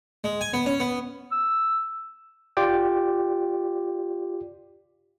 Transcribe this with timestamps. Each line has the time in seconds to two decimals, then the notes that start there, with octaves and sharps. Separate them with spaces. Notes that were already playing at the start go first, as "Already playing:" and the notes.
0.24 G#3
0.41 G#5
0.53 B3
0.66 C#4
0.80 B3
1.31 E6
2.57 F4 G4 D5 G5